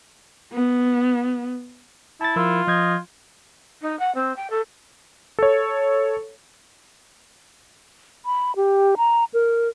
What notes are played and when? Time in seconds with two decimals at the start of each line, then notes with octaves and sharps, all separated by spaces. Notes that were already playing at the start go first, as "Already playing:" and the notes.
0.53 B3
2.21 E4 A5 A6
2.36 F3 F4 A#4 E6
2.67 F3 D#5 G6 G#6
3.82 D#4
3.99 F#5
4.15 C4
4.36 G5
4.50 A4
5.39 A4 C#5
8.26 B5
8.56 G4
8.97 A#5
9.34 A#4